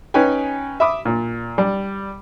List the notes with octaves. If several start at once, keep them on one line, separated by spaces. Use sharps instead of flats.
C#4 D#4 B4 G5 G#5
E5 B5 D6 D#6
A#2
G3